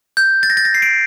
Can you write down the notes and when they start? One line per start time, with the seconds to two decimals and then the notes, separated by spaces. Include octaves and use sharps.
0.17 G6
0.43 A6
0.50 A#6
0.57 A6
0.65 A#6
0.75 C7
0.82 D7